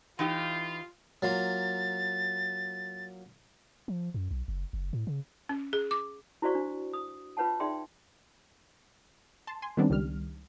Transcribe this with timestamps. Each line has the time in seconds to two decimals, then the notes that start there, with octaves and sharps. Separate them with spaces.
0.19 E3 D#4 F4 G4
1.22 F#3 A#3 F4 A6
3.88 F3
4.14 F#2
4.31 B1
4.48 F#1
4.73 F#1
4.93 A2
5.07 C#3
5.49 C#4
5.73 G#4
5.91 D6
6.42 E4 F#4 C5 D5 F5 C#6
6.55 D4
6.94 D#6
7.37 F4 B4 C#5 F#5 A5
7.60 D#4 G#4 D5 E5 G5 C6
9.47 A5 C6
9.62 G#5 C6
9.77 D#3 G3 B3 C4 D4
9.90 C#2 D#3 G3 F6